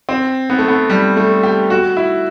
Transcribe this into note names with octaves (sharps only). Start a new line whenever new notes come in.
C4
B3
A3
B3
G3
A3
G4
F#4
E4